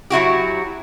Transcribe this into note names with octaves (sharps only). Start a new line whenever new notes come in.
F#3 E4 F#4 G4